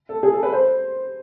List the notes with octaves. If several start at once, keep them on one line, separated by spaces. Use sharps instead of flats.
A4
G#4
A4
B4
C5